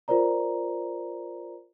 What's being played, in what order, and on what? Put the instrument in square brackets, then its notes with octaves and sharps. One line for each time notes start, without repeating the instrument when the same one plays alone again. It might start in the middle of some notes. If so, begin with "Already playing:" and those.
[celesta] F4 A#4 C5 D5 A#5